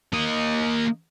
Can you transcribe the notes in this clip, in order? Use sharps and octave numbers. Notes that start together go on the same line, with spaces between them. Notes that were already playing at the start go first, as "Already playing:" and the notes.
A#3 D#5